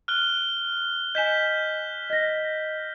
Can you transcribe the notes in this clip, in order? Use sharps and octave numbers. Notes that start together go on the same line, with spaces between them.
F6 F#6 G7
D#5 G#5 G6 B6 E7
D#5 A#6